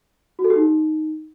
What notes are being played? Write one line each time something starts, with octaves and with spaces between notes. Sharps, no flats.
F#4
A4
G4
D#4